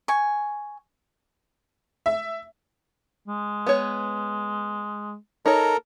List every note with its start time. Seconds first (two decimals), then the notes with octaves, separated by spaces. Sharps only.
0.08 G#5 C#6
2.06 E5
3.28 G#3
3.67 B3 C#5
5.46 D#4 A4 A#4 C#5